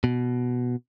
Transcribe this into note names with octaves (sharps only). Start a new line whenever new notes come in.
B2